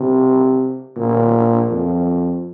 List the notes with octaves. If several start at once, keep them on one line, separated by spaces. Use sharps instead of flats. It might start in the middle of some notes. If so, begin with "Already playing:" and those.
Already playing: C3
A#2
F2